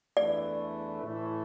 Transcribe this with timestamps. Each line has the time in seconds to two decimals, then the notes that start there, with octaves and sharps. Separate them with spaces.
0.17 E2 E3 A3 D4 D5
1.02 A2 E3 A3 E4